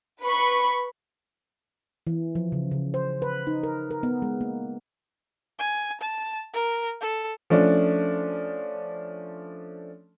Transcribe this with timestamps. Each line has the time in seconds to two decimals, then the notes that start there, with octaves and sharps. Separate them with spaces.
0.22 B4 B5 C#6
2.07 E3
2.35 F3
2.52 C#3
2.71 C#3
2.94 C5
3.22 B4
3.47 D#4
3.63 A#4
3.91 A#4
4.03 B3
4.22 G#3
4.41 A#3
5.59 G#5
6.01 A5
6.54 A#4
7.01 A4
7.50 F3 A3 C#4 D4